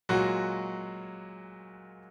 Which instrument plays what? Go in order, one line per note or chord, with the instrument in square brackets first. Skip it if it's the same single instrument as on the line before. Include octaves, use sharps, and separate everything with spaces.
[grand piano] A#2 F#3 G#3 F#4